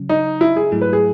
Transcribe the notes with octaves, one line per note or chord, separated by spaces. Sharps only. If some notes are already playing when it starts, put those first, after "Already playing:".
Already playing: C#3 F#3 C#4
D#4
E4
G#4
G#2 F#3 A3 E4
B4
G#4